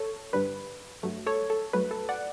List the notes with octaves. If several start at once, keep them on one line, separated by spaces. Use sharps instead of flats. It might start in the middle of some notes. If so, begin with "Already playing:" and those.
Already playing: A4 C#5
G2 D3 G3 B4
G2 F#3 A3
A4 C#5
A4
G2 F#3 A3 B4
A4
D5 F#5